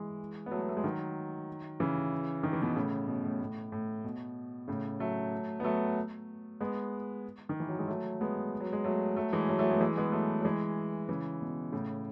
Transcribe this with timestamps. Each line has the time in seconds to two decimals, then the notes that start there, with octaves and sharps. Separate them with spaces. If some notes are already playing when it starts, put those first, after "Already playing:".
Already playing: E3 G#3
0.46 B3
0.51 F#3 A3
0.62 B3
0.69 A3
0.77 G#3
0.83 D#3 F#3
1.80 C#3 E3
2.43 D#3
2.53 E3
2.62 B2 D#3
2.76 A2 C#3
3.08 B2
3.24 A2
3.41 A2
3.72 A2
4.04 B2
4.68 A2 C#3
5.00 F#3 A3
5.60 B3
5.64 F#3 A3
6.61 G#3 B3
7.49 D#3
7.60 E3
7.69 F#3
7.79 G#3
7.88 F#3 A3
8.21 G#3 B3
8.60 F#3
8.73 G#3
8.84 F#3 A3
9.16 F#3 A3
9.33 E3 G#3
9.49 F#3 A3
9.59 F#3 A3
9.70 G#3 B3
9.80 E3 G#3
9.97 G#3 B3
10.12 F#3 A3
10.40 F#3
10.45 E3 G#3
11.09 C#3 E3
11.41 B2
11.72 A2 C#3